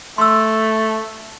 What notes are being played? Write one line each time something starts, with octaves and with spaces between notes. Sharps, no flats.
A3 C6 E6